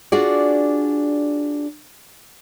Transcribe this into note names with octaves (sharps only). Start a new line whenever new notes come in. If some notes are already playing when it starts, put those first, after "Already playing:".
D4 F4 F#4 G#4 D5